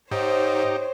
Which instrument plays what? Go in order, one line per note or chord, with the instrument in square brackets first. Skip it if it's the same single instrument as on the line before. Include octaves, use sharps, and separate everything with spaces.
[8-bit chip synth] G#2 [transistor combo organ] D#4 G4 [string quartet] C5 C#5